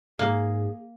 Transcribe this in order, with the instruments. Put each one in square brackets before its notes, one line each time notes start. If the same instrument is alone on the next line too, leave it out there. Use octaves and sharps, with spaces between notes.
[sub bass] G#2 [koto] A#3 [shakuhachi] G#4